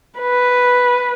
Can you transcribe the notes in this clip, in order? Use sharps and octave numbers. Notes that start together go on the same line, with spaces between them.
B4